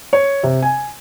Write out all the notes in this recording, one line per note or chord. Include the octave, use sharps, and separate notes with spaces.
C#5
C3
G#5